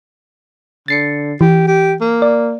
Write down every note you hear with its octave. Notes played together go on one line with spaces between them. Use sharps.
D3 A6 C7 C#7
E3 G4
G4
A#3
D5